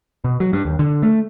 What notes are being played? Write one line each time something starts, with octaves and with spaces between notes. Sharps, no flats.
B2
F#3
G2
D#2
D3
A3